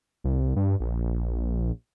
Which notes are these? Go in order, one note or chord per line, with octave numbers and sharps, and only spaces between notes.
C2
G2
A#1